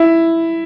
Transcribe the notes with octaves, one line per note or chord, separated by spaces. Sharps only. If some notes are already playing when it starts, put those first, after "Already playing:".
Already playing: E4